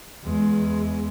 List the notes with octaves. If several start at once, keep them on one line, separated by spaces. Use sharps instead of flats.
E2 G#3